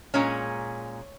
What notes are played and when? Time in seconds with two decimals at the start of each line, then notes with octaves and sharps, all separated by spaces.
0.14 A#2 G#3 C#4 C#5